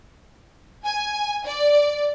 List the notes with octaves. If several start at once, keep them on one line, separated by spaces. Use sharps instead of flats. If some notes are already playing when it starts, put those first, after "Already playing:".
G#5
D5